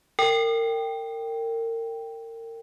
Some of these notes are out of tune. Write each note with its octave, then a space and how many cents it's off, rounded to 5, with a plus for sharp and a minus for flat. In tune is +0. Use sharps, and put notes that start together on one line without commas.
A#4 -35 G5 +0